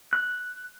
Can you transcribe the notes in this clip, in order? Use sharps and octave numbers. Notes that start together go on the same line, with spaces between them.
F#6